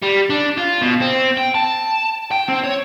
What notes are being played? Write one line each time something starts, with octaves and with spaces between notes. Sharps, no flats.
G3
D4
F4
B2
C4
G5
A5
G5
C4
C#5